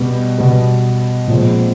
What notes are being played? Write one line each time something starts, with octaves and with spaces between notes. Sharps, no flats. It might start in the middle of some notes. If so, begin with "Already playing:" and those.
Already playing: B2 G3 B3
B2 G3 B3
A#2 F3 G#3 C4